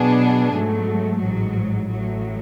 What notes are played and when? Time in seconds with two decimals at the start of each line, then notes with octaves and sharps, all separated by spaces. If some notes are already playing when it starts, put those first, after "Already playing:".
Already playing: B2 F#3 B3 D4 G#4
0.53 G#2 F#3 A3
1.21 A1 G#2 F#3
1.88 A1 A2 F#3